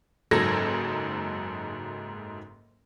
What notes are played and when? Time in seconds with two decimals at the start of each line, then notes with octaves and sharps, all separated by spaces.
0.31 F#1 G#2 F#3 A4 G#6 A#6